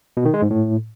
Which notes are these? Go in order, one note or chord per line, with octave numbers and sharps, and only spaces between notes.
B2
D#3
G#3
G#2
A2